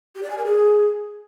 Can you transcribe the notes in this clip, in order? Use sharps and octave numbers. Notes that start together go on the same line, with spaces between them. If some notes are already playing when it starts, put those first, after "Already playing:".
G4
D5
G#5
A#4
G#4